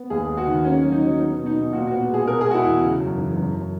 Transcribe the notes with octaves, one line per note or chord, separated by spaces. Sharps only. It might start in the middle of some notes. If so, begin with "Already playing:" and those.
Already playing: B3
D#2 G#4
G#3
F#4
D#3
A#3 C#4
F#3
D#4
F#3
B3 D#4
B2
D#4
B2
A#2 F#4
B3 F#4
G#3 G#4
B2 A#4
G#3 G#4
F#4
E4
E2
C#3
F#2
E3
F#2
F#2